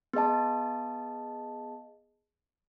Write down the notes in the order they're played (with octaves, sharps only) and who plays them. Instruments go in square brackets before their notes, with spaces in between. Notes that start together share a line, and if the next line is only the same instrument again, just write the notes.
[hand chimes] B3 G#4 D#5 A5